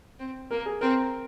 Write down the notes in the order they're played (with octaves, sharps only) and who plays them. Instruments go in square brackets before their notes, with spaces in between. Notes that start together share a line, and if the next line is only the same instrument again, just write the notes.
[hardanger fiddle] C4
[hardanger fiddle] A#3 [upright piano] A#4
[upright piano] G#4
[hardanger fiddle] C4 [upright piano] A#4